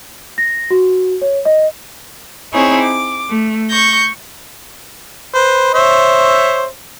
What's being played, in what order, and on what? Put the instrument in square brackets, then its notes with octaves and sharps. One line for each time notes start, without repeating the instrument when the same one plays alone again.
[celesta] A#6
F#4
C#5
D#5
[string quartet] C4 D#4 E4 G#4 C#5
D6
A3
C#6 G6 A#6
[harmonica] B4 C5
C5 C#5 E5